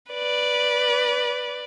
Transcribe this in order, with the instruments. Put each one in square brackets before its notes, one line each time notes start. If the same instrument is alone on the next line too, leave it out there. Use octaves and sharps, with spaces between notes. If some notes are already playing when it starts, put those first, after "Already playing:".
[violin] B4 D5